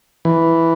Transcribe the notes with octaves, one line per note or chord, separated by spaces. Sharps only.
E3